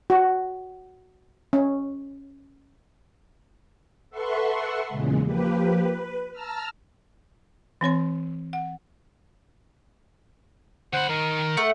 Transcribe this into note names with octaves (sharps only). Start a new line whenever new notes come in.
F#4
C#4
A4 B4 E5 F#5 C6 C#6
E2 A#2 C#3 G#3
F3 A#3 G4 B4
B4
A5 A#5 E6 F6
E3 C4 C#5 C6
F#5
D3 C5 F#5 B5
D#3 A#4
A3 F#5